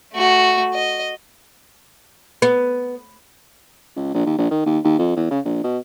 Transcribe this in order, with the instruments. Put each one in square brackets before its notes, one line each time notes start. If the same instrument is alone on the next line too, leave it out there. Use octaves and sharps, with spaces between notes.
[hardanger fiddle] A3 F#4
D#5
[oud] B3
[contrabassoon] C#2
A#1
D#2
A#1
D#3
D#2
D#2
F2
E2
C#3
A#1
B2